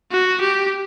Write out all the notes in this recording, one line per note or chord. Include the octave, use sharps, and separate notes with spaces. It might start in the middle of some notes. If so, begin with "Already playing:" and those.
F#4
G4